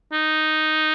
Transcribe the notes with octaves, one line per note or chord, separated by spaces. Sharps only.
D#4